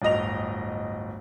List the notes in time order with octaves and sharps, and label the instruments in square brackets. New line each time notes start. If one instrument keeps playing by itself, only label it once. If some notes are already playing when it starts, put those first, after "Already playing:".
[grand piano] D1 G1 D#5 F7